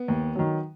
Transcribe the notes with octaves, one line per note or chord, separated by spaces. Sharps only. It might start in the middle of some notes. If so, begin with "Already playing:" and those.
Already playing: B3
D#2
D#3 F#3